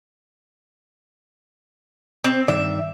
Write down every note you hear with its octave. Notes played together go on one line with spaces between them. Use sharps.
C4
G2 D#3 D5 E5